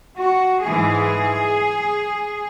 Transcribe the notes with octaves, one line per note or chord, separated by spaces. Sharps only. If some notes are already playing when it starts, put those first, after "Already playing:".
F#4
G#2 E3 G#3 G#4